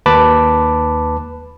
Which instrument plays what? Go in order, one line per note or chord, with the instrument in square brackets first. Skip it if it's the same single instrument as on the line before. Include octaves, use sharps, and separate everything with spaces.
[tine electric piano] D#2 B4 A5 B5 D6